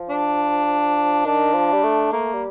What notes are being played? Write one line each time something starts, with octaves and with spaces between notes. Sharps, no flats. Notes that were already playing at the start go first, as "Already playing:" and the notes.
Already playing: F3
D4
D#3 D4
F3
G3
A3
A3 A#3
G3